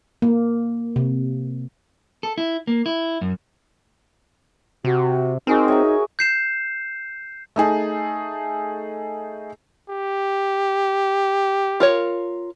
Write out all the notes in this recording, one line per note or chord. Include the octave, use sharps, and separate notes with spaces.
A#3
C3
A4
E4
A#3
E4
F#2
C3 F#4
C4 D#4 F#4 G#4 A#4
C#5 E5 A#5
G6 C7 E7
A3 D#4 G#4 A5
G4
F4 A#4 C#5